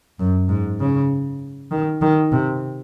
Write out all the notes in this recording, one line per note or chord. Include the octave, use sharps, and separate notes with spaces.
F#2
G#2
C#3
D#3
D#3
C3